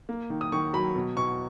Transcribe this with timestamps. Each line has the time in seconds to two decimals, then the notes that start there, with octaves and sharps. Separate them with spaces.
0.09 A#3
0.30 D#3
0.41 D#6
0.52 D#3 C#6
0.73 F#3 B5
0.96 B2
1.16 B2 C#6